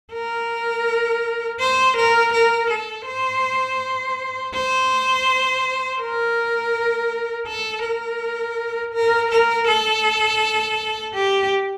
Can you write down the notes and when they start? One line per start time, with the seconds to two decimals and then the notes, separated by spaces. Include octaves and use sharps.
0.13 A#4
1.60 C5
1.97 A#4
2.33 A#4
2.70 A4
3.07 C5
4.54 C5
6.01 A#4
7.47 A4
7.84 A#4
8.94 A#4
9.31 A#4
9.67 A4
11.14 G4